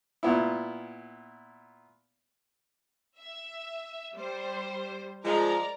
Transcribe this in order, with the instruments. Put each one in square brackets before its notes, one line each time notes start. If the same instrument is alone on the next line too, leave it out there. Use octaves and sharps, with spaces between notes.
[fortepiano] A#2 B3 E4
[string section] E5
G3 C5
[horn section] F3 G#3 [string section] A#4 D5 A#5